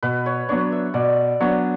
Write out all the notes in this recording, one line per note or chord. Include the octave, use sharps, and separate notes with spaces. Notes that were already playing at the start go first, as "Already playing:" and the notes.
B2 B4
C#5
F#3 B3 D4 C#5
E5
B2 D5
F#3 B3 D4 C#5